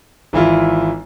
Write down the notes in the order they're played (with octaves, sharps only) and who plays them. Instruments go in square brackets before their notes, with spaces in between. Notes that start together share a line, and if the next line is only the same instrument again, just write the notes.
[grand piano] G#1 E3 E4 F4